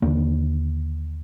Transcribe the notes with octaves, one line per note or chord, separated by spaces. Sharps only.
D#2 D3 A#3 D4